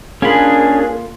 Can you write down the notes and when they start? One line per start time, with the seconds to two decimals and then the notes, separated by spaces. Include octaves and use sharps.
0.22 A#3 C#4 D4 F4 G#4 A#4 B5